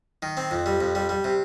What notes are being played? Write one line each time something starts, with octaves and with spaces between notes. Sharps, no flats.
D#3
C4
F2
G3
F2
G3
G3
C3